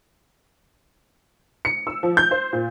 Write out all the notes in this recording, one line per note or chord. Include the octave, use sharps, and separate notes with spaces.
C#7
E6
F3
G6
C5
A#2